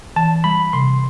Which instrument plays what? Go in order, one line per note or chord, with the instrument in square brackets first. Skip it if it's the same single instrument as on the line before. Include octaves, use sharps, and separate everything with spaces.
[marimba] E3 [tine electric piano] A5
[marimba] G3 [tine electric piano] B5
[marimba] C3 [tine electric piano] C6